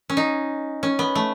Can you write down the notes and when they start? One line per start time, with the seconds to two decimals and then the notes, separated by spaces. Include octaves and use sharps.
0.10 C#4
0.17 D#4
0.83 C#4
0.99 B3
1.15 A3